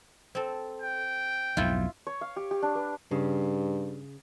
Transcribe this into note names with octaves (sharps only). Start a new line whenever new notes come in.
C4 A4
G5
B1 F2 G#2 E4 F4
C#5
F5
G4
G4
D4
B4
G2 C#3